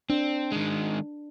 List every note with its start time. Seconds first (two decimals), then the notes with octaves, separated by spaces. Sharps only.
0.10 C4 D4
0.52 D#3 G#3